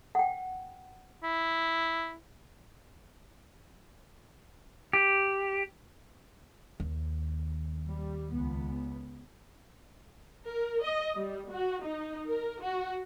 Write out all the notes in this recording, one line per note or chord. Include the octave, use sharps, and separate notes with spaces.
F#5 G5
E4
G4
D#2
G3
C#2 B3
A#4
D#5
G3
F#4
D#4
A#4
F#4